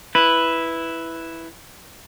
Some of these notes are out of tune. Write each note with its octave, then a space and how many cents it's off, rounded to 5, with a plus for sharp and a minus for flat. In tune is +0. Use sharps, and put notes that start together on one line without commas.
E4 +0 B4 +0